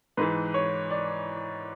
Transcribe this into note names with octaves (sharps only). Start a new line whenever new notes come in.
G#2 E3 B4
C#5
D5